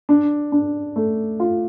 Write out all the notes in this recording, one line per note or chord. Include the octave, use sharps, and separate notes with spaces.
D4
D4
A3
F4